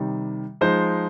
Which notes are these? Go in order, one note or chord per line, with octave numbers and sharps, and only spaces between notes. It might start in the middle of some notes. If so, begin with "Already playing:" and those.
Already playing: C3 D#3 G3
F3 G#3 D#4 C5